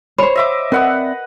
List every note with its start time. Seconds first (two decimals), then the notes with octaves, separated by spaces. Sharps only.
0.18 C5 C#5 B5
0.35 D#5 E5 D6
0.72 C4 A#4 B4 D5 E5 F#5 D#6